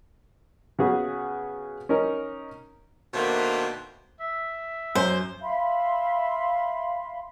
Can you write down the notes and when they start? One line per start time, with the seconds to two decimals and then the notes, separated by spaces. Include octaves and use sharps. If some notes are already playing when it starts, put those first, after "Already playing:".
0.79 C#3 B3 F#4 G#4
1.89 C#4 D#4 A#4
3.14 B2 D#3 A3 A#3 D4 C5
4.20 E5
4.95 F#2 C5
5.42 E5 F5 B5 C6